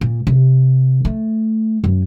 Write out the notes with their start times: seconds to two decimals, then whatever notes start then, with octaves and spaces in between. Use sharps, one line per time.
0.01 A#2
0.27 C3
1.05 A3
1.84 F#2